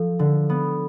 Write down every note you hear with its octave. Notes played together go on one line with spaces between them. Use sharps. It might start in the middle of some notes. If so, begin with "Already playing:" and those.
Already playing: F3 A4
D3
B3